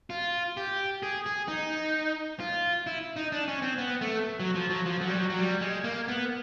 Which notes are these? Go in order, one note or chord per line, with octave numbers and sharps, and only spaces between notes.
F4
G4
G#4
G#4
D#4
F4
E4
D#4
D4
C#4
C4
B3
A3
F#3
F3
F#3
F3
F#3
G3
F#3
F#3
G3
G#3
A#3
B3